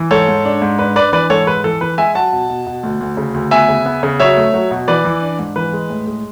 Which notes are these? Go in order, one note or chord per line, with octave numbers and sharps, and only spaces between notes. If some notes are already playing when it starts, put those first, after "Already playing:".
Already playing: E3
G#2 A4 C#5
G#2
D4
G#2
D4 B4
D4 B4 D5
E3 B4 D5
G#2 A4 C#5
G#3 B4
E3 A4
E3 B4
G#3 E5 G#5
F#3 F#5 A5
B2
B2
B2
D2
D2
C#3
D2
B3 E5 G#5
C#3
B3
C#3
F#3 C#5 E5
A3
F#3
B2
E3 B4 D5
E3
D4
G#2
E3 B4
G#3
A2
G#3